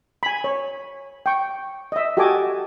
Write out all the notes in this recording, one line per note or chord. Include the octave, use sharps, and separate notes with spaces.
G#5 B5
C#5
G5 C#6
D#5 E5
F#4 G4 A4 D#5 G#5 D6